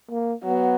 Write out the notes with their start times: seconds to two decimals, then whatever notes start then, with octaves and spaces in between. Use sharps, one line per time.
0.11 A#3
0.44 F#3 B3